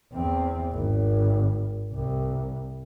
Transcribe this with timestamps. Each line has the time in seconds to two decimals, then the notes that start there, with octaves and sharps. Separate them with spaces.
0.12 E2 C4
0.73 G#1
1.92 C2